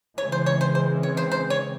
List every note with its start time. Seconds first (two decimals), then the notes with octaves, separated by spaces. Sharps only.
0.18 C#3 E3 G#3 C4 C#5
0.32 C5
0.46 C#5
0.61 C5
0.75 C5
1.03 C#5
1.17 C5
1.32 C5
1.50 C#5